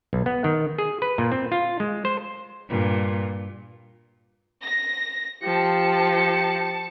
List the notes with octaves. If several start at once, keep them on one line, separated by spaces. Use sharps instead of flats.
B1
B3
D#3
G#4
B4
A#2
C4
F4
G#3
C5
G2 A#2
A#6
F3 G4 A5 C#7